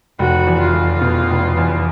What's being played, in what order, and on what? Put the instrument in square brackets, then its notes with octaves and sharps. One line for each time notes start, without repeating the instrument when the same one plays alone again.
[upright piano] F1 [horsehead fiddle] F#4
[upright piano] E2
[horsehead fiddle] F4
[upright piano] F1
B2
F1
E2